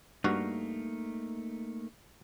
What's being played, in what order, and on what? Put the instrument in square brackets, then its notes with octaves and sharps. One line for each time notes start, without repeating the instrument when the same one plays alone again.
[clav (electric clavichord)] G2 F#4 [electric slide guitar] A3 A#3 D#4